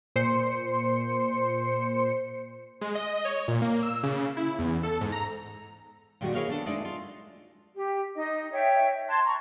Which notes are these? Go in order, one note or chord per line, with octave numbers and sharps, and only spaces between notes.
A#2 C5 C6 C#7
G#3
D#5
C#5
A#2
A#3
E6
C#3
E4
E2
A4
G#2
A#5
A#2 D#3 G3 G#3 D4 F#4
E4 G#4 A#4 C#5 D#5 F5
B3 D4 A4
G#3 A3 D4 D#4 D5 D#5
F4
G4
D#4 D#5
C#5 E5 G5
A5 C6 F#6 G#6
A#5 C#6